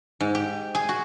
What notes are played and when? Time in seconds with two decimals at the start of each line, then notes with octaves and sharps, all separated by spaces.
0.20 G#2
0.35 G4
0.75 G#4
0.89 F#4